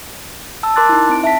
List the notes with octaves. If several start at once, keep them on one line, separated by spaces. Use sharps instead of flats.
A5 E6
A#4 A5 C6 D6 F#6 A6
D#4 E4
C4 D7
E5 A5 B6